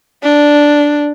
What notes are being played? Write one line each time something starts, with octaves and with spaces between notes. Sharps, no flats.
D4